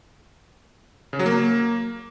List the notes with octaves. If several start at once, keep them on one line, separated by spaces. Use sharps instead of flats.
C#3
F#3
A#3